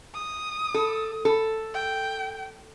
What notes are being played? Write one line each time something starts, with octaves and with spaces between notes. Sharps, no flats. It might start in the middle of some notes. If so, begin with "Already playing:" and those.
D#6
A4
A4
G5